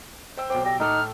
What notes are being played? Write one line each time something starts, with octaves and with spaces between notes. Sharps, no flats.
C5 G5 E6
B1 C4 G5 D6
G4 A#6
A2 D#4 A4 D6 F6